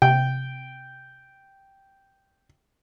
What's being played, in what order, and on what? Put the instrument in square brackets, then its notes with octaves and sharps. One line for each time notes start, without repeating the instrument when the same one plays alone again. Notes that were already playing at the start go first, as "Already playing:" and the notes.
[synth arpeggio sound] C3 [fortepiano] G5